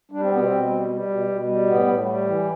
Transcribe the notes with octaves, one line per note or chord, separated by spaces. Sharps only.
G3 D4
C4
B2 B3
C4
B2
G3
G3
B2
B2
G3
A2 B3
A2
G3
E3